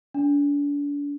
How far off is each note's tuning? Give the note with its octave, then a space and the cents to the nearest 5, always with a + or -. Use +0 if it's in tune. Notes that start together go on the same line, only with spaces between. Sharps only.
D4 -35